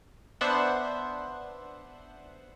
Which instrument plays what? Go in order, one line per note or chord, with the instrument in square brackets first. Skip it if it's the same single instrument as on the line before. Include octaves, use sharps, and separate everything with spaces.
[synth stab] B3 D4 C5 E5 F#5